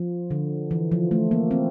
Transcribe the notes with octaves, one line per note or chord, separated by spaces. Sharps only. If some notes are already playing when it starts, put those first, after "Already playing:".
Already playing: F3
D3
E3
F3
A3
A#3
C4